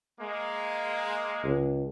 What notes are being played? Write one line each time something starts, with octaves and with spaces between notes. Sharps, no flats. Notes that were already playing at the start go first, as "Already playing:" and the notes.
G#3 A#3
C#2